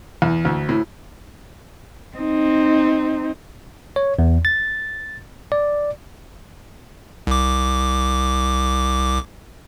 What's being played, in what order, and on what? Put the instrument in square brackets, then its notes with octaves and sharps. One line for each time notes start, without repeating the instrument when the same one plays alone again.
[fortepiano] E2
D2
A2
[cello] C4 D#4
[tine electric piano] C#5
E2
A6
D5
[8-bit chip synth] C2 D6